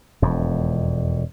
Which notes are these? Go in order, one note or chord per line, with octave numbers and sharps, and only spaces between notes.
E1 F2